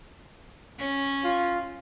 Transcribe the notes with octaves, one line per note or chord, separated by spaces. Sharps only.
C#4
F4